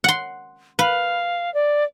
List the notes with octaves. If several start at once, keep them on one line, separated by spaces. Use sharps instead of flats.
F#5 C6
B4 F5
D5